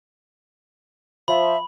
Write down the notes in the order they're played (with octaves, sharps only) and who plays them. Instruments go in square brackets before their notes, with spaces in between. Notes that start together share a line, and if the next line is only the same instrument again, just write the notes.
[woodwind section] F3 [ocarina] E5 [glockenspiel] B5